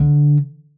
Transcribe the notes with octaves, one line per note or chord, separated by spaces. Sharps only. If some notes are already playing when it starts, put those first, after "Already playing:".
Already playing: D3